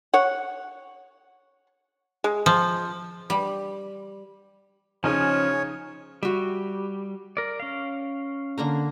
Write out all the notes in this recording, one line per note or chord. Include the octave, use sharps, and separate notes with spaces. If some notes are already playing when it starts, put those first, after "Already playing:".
C#5 F#5
G#3
F3
G3
C#3 F3 C#4 D#4 C#5 G#5
G3 F#4 E5
A#4 D5
C#4 F5
D3 A#3 A#5